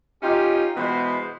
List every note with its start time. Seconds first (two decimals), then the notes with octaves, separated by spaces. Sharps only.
0.22 C#4 D#4 F4 G4
0.76 B2 E3 G#3 B3 B4 C5